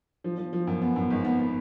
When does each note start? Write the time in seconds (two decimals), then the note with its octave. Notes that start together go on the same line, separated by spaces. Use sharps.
0.24 F3
0.38 F3
0.53 F3
0.67 F#2
0.82 B3
0.96 F#2
1.10 G#1
1.25 B3
1.39 B3